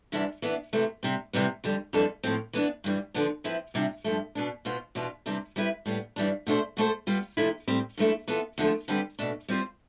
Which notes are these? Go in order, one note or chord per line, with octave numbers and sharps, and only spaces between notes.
C3 E3 G3 B3 D4
E3 B3 D4
C3 E3 A3
C3 G3 C4
C3 E3 G3 B3
F2 D3 G3
F2 E3 G3 D4 A4
A2 F3 C4
E3 B3 D4
G2 E3 G3
D3 F3 B3 D4
F3 C4 E4 B4
E2 C3 G3 D4 F4
G2 F3 A3
B2 B3 D4
B2 B3 F4 C5
E2 B2 B3 D4 F4
C3 E3 G3 D4
G3 C4 E4 B4
A2 G3 B3
G2 E3 G3 D4
B2 A3 D4 G4 C5
B2 A3 E4 A4 C5
G3 B3 F4
F2 C3 F3 A3 E4
A2 G3 C4 G4 C5
G2 F3 A3 E4
E3 B3 F4 A4
E2 D3 F3 A3
D3 G3 C4 G4 B4
B2 A3 D4
G3 C4 F4 C5